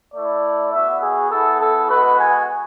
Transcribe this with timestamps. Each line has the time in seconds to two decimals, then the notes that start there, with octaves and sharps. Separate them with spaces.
0.13 A3 E4 D5
0.72 B3 F#4 E5
1.02 G#4
1.31 B3 E4 A4
1.60 A4
1.89 G#3 B3 F#4 B4
2.19 G#5